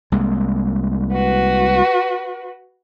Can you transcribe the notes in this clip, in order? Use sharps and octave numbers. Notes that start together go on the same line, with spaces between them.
C2 G#3 A#3
F#4 B4